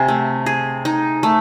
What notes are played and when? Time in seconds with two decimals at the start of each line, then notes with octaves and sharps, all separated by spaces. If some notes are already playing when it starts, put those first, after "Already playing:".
Already playing: C3 G#5
0.08 A3
0.46 G#4
0.85 D#4
1.23 A3